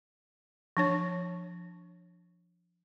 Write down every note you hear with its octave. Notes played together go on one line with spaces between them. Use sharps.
F3 D4 C#5